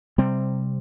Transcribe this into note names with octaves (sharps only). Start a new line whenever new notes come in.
C3 G3 C4